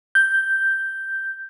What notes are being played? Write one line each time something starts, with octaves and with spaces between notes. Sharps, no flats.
G6